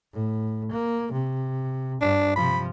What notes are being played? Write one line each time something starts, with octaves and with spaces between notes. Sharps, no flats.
A2
A#3
C3
G2 D4
C3 F3 B5